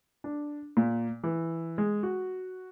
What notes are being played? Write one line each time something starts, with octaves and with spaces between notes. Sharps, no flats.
D4
A#2
E3
G#3
F#4